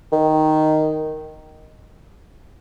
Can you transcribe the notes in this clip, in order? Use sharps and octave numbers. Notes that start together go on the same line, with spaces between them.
D#3